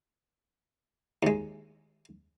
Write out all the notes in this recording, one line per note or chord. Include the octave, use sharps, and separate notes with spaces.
D#2 G#3